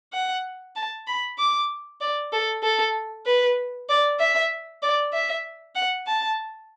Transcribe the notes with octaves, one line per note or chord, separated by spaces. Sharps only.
F#5
A5
B5
D6
D5
A4
A4
B4
D5
E5
D5
E5
F#5
A5